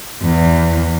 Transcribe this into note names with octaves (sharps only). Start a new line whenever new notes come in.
E2